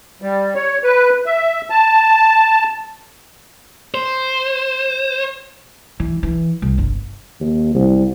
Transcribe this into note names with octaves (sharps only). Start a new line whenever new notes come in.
G3
C#5
B4
E5
A5
C5
E3
E3
C2
G1
D#2
C2